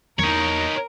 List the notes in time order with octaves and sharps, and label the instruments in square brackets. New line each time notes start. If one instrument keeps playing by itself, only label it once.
[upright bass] E2 A#3 [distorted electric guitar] D#4 C#5 [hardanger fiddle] A#4